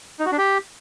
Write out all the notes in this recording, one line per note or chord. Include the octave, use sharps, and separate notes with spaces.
D#4
F#4
D4
G4